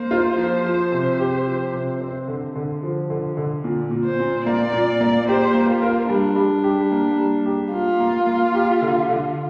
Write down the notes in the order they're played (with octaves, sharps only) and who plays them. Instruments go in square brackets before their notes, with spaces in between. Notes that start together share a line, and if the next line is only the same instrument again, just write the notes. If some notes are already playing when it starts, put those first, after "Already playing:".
Already playing: [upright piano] A#3 [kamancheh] C5
[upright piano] F4
F3
F3
C3
G4
F3
C3
C4
D3
D3
F3
D3
D3
A#2
A#2
[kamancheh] C5
[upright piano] A#2
[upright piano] A#3 [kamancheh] D5
[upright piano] A#2
A#3
[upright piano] G4 [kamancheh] C5
[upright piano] A#3
[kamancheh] F4
[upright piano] A#4
[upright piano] G3 [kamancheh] D4
[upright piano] G3
G4
A#3
G3
G4
[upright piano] A#3 [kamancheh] F4
[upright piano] A#3
A#3
G4
D3
D3